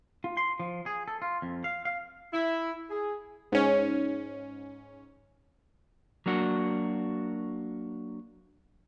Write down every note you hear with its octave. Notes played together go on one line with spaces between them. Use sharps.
F4
C6
F3
G#4
A4
F4
F2
F5
F5
E4
G#4
G#2 C#4
F#3 A#3 D4 F#4